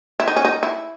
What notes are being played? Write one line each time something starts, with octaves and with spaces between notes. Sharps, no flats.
E4
D#4
C#4
D#4
E4